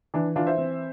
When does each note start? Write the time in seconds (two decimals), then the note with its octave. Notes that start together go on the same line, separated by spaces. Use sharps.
0.14 E3 D4
0.36 E3 D4 F4
0.47 C5 E5
0.58 C4